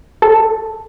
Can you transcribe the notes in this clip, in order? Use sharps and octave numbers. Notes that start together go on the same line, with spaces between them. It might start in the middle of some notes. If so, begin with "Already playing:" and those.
A4